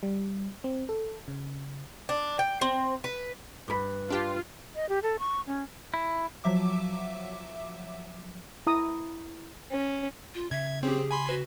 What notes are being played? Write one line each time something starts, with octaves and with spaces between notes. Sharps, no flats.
G3
C4
A4
C#3
D4
G5
C4
B4
G2 A#4 B4 B5
D4 F4 G4
D#5
G4
A4
C#6
C#4
E4
F3 F#3 E5 D6
E4 A#5 D#6
C#4
F4
C#3 E5 G#6
C4 C#4 G4 G#4
G#5 B5 C6
F#4 B4